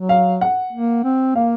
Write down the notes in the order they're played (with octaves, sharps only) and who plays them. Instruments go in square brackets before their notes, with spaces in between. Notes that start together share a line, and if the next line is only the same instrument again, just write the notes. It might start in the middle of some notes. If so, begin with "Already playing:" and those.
Already playing: [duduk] F#3
[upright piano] F5
F#5
[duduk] A#3
C4
[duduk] A#3 [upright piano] F5